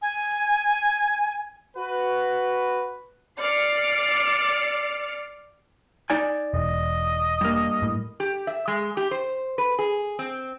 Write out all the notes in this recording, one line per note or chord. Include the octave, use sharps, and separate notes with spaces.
G#5
F#4 B4
D5 F6 C7 C#7
D#4 D5 G#5
E1 D#5
G2 A#3
A2
G4
E5
G#3
G4
C5
B4
G#4
C4